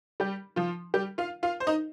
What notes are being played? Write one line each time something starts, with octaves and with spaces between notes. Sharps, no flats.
G3 G4
F3 F4
G3 G4
F4 F5
F4 F5
C5
D#4 D#5